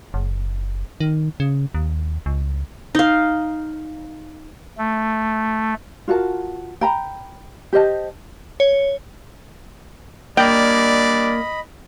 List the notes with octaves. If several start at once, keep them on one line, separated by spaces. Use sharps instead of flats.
F#1
D#3
C#3
D#2
C#2
D#4 F5
A3
F4 F#4 A#4 A5
G5 A#5 B5
G4 C5 D#5 A5
C#5
G3 A#3 D4 D5 D#5 G5 B5